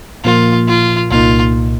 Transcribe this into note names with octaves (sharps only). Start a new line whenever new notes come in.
A#2 F3 A#3 F4
F4
C2 A#2 A#3 D#4 F4